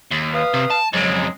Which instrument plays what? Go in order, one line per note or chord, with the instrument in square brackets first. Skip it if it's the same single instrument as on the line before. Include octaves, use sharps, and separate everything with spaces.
[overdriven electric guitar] D#2
[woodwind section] B4 F5 D#6
[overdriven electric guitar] C3
A5
[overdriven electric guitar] F2 C#3 [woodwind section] F#3 G#3